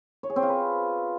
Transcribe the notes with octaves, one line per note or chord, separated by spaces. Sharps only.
C#5
G#4
C4
F4
B4